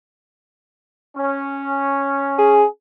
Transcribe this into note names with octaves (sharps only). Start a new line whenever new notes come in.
C#4
G#4